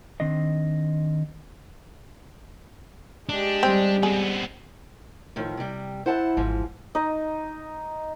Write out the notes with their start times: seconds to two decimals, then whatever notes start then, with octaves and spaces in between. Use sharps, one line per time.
0.20 D#3 C4 D4 D#5
3.29 G#3 D4 G4
3.63 G3 C4
4.03 B3 C4 G#4
5.36 A2 D#3 F3
5.57 C3 G3
6.06 E4 C5 F#5 A5
6.37 G#1 C#2 G#2 E3 F3
6.95 D#4 D#5